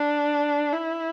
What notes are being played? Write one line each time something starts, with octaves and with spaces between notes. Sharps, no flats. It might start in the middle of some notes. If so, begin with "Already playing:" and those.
Already playing: D4
E4